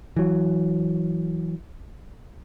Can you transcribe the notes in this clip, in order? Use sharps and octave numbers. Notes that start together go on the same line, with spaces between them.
E3 F#3